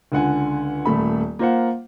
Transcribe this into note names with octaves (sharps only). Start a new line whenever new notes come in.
C#2 D3 F#5 G#5
D#1 A3 B5
A#3 F4 C5 F5 F#5